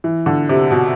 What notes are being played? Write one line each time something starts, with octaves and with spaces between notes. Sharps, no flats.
E3
D3
C3
B2